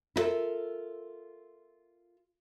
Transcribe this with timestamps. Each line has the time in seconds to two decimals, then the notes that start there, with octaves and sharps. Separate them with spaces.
0.16 E4 F4 A4 A#4 E5